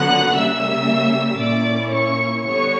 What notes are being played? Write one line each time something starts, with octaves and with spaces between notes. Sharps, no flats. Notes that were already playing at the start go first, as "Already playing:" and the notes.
Already playing: D3 F#3 B3 D4 F#5 F#6
C#3 G3 A#3 E5 E6
A#2 A#3 C#4 E4 D5 D6
C#5 C#6
D3 G3 B3 C#5 C#6